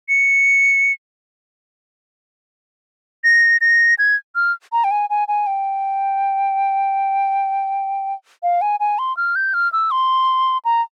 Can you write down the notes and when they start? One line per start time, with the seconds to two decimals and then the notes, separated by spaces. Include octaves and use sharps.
0.09 C#7
3.24 A#6
3.61 A#6
3.99 G#6
4.35 F6
4.72 A#5
4.84 G5
4.91 G#5
5.10 G#5
5.28 G#5
5.47 G5
8.43 F5
8.62 G#5
8.80 G#5
8.99 C6
9.17 F6
9.36 G6
9.54 F6
9.73 E6
9.91 C6
10.65 A#5